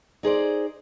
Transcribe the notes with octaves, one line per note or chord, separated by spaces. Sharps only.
D#4 G#4 C5 D5